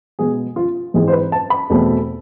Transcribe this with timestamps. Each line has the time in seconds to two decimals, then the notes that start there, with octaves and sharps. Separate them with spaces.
0.19 B2 G#3 B3 G#4
0.56 F4
0.94 G#2 E3 G#3 C4 G#4
1.08 C5
1.12 B4
1.32 A5
1.50 B5
1.70 E2 B2 A3 C4